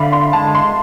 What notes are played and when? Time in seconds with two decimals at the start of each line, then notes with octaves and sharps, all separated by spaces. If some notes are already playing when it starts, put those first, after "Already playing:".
Already playing: D3 D5 E5 F5 B5
0.12 C6
0.33 G#3 A5
0.55 C6